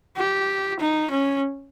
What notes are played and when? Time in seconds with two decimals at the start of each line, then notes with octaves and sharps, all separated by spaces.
0.17 G4
0.80 D#4
1.11 C#4